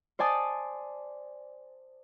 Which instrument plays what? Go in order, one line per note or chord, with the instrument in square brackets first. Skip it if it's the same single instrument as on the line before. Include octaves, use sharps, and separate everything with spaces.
[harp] C5 D5 G#5 A5 D#6